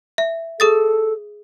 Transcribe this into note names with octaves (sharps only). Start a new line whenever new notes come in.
E5
G#4 A4 D#6 A6